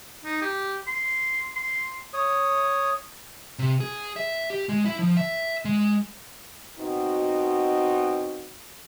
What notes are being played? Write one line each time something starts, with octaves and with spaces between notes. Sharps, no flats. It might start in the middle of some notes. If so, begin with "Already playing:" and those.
D#4
G4
C6
C6
C#5 D#6
C3
G#4
E5
G4
G#3
E4
F3
E5
G#3
B2 C4 D#4 F#4